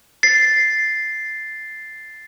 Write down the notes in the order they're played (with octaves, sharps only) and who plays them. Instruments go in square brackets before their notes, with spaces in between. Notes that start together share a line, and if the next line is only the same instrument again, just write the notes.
[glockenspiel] A6 C7